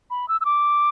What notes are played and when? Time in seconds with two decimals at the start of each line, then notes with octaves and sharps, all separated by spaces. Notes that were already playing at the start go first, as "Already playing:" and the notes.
0.10 B5
0.28 E6
0.41 E6
0.45 D6